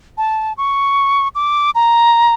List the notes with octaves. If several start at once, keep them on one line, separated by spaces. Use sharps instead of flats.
A5
C#6
D6
A#5